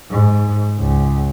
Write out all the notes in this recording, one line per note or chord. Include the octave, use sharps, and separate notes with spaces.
G#2
C#2